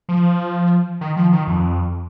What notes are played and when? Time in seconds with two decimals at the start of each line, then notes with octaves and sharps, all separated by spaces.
0.09 F3
1.01 D#3
1.16 F3
1.32 D#3
1.47 F2